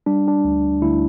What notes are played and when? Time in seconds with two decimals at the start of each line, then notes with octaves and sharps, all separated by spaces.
0.06 G3 D4
0.28 D4
0.44 D2
0.81 D2 E4